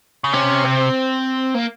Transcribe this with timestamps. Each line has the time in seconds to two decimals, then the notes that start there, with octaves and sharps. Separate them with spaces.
0.24 C#3
0.33 C3 C#4
0.64 C4
1.54 A#3